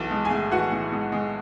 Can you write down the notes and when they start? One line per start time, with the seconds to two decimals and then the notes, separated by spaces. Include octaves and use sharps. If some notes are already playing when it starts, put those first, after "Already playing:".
Already playing: B1 E3 A4 A5
0.11 G#3
0.25 G#4 G#5
0.31 A2
0.51 E3 F#4 F#5
0.72 A2
0.92 G#3
1.12 G#3